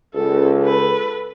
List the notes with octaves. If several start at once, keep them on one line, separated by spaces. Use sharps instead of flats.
C#2 A4
A4 B4